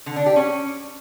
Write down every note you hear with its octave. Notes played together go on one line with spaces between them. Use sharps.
D3
D4
G4
C#4